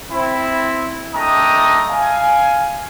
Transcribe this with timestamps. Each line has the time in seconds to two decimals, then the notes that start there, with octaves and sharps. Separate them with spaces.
0.11 C4 E4
1.15 A3 D4 D#5 G5 A#5 D#6
1.89 F5 G#5